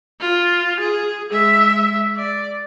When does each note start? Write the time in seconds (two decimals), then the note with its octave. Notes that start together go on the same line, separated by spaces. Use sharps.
0.20 F4
0.80 G#4
1.31 G#3 E5
2.17 D5